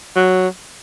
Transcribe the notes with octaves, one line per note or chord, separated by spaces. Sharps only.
F#3